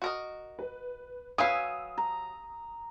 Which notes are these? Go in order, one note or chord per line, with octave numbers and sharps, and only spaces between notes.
F#4 A#4 D#5
B4
F#3 B4 F5 G#5 D#6 E6
A#5